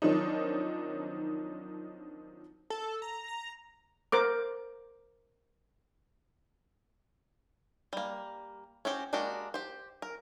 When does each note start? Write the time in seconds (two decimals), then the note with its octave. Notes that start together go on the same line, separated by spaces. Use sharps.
0.02 D#3 F3 F#3 C4 D4 D#4
2.70 A4
3.02 A#5
3.28 A#5
4.12 A#4 C5 D6
7.93 G3 A#3
8.85 C#4 F#4 G4 C5
9.13 G#3 A#3 D4 F#4 G4
9.54 G4 C5
10.02 A#4